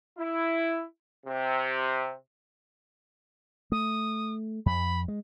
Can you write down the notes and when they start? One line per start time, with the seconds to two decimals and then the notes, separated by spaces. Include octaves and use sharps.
0.18 E4
1.26 C3
3.72 A3 D#6
4.66 F2 B5
5.08 G#3